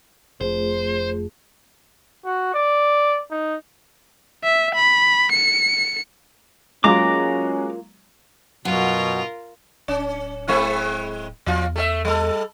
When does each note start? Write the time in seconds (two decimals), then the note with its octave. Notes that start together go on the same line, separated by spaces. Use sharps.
0.41 F1 A3 F4 G#4 C5
2.25 F#4
2.54 D5
3.31 D#4
4.44 E5
4.75 B5
5.32 C#7
6.84 F#3 G#3 A#3 C#4 F4 A#5 D6
8.65 F#2 B2 F4 F#4 A#4 F#5
9.88 D1 C#4
10.48 G#3 C4 E4
11.46 E2 F3 F4
11.76 A3 G4 E5
12.05 G3 A4